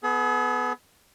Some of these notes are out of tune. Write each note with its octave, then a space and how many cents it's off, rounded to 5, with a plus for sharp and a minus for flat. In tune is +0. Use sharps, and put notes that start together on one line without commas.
B3 +5 G#4 +45